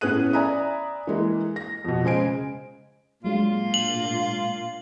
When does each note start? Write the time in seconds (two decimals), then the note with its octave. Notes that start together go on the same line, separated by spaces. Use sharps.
0.01 A2 B3 C#4 G#4 F#6 D#7
0.33 D5 E5 G#5 A#5 B5 D#6
1.07 E3 G#3 A#3
1.56 A#6
1.85 F2 B2
2.04 C#3 G#3 C5 G#5 D7
3.24 A#2 F#3 G#3 D4 F4
3.74 F#7